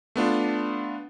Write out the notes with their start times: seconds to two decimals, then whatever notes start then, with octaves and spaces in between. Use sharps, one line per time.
0.16 A3 B3 D4 F4